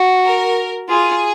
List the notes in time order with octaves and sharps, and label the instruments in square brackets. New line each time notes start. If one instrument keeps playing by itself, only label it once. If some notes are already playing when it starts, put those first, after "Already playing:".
Already playing: [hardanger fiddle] F#4
[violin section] A#4
[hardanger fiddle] F4 [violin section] G#4